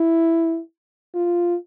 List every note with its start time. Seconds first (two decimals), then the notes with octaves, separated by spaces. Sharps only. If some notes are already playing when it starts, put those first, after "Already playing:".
Already playing: E4
1.14 F4